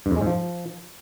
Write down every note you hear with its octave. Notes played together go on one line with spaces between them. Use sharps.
G2
F2
G#3
G#2
F3